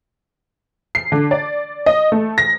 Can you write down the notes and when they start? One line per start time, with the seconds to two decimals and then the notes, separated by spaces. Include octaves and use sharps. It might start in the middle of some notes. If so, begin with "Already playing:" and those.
0.95 C7
1.12 D3
1.31 D5
1.86 D#5
2.12 A3
2.38 A#6